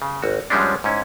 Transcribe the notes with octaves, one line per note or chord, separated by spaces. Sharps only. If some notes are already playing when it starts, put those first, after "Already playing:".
C#3
G#1 F#4
F#2 F3 G3 G#3 C#4 D4
G#2 C#4 E4